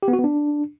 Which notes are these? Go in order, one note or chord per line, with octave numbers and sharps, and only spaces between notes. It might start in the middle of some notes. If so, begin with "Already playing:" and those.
G4
B3
F#4
B3
D4